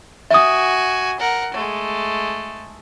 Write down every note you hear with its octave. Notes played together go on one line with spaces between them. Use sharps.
F#4 E5 G#5 D#6
A#4 F#5
G#3 A3